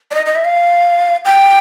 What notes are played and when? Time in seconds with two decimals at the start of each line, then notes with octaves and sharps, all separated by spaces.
0.11 D5
0.14 D#5
0.26 D#5
0.35 E5
0.45 F5
1.25 G5